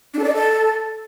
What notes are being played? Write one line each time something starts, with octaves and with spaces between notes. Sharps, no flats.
D4
A4
D5
D#5
A4